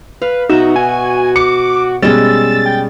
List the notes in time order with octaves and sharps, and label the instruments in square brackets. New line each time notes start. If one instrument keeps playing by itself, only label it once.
[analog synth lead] B4 [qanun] F5
[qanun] B2 E5 [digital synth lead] D#4 [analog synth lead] F#4
[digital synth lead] G#5
[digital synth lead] D6 [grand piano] C#7
[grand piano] B2 G3 [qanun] G#3 C#4 [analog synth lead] E6 [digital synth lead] A6
[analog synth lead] G5